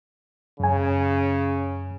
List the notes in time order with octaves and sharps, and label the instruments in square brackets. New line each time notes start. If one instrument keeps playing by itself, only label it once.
[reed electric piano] F#2 G#5 [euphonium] C#3